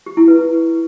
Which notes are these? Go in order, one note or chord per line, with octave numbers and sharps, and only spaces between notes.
G4
E4
B4